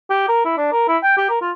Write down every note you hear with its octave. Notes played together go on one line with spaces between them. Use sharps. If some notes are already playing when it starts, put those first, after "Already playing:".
G4
A#4
E4
D4
A#4
E4
G5
G4
A#4
F4